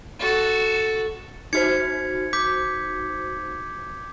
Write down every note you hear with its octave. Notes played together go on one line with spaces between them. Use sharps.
F#4 A4
D#4 F#4 C5 G#6 C#7
D6 G6 B6